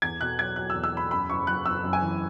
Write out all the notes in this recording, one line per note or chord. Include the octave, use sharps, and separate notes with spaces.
E2 G#6
B2 F#6
F#3 G#6
F#3 F#6
E6
E2
E6
E2 B5
F#2 B5
F#1 C#6
F#1 F#6
F#1 E6
F#2
G#5
E3